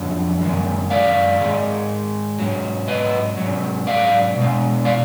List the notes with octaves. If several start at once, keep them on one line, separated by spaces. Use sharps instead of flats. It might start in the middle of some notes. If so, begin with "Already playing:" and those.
Already playing: F2 D3 F#3
F#2 D#3 G#3
D5 F5
G#2 D#3 G#3
G#2 F#3
B4 D#5
F#3
G#2
D5 F5
B2
G#3
D5 F5